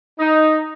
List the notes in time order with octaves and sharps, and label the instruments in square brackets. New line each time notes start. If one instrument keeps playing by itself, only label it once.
[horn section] D#4